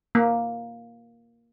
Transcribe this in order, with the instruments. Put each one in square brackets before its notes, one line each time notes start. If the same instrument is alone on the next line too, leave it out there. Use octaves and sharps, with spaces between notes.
[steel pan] A#3